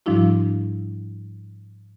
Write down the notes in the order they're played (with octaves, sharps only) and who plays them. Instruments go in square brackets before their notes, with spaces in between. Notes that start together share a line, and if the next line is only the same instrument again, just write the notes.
[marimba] G#2 F3 G3 D4 E4 F#4